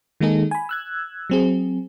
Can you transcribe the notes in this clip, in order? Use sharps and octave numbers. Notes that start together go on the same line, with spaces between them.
D#3 G#3 A#3 D#4 G#4 A4
G#5 B5
E6 F#6 G#6
F#3 C4 G#4